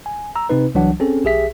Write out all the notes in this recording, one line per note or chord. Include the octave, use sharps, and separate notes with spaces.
G#5
A#5 E6
C3 C4 D#4 B4
C2 E3 F#3 D4 F#5
C4 C#4 G#4 A4
B1 G4 G#4 E5 B6